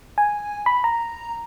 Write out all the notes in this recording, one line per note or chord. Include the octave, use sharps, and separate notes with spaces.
G#5
B5
A#5